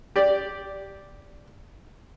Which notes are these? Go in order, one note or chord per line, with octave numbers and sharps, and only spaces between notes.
G4 D5